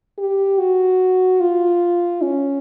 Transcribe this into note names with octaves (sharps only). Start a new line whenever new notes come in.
G4
F#4
F4
C#4